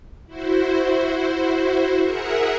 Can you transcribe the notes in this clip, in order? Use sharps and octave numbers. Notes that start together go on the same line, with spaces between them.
E4 F#4 C5
G#4 A#4 E5 F#5